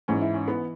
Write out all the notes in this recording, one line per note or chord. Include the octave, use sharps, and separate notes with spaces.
G#2 E3 C#4
E4
C#4
E3 B3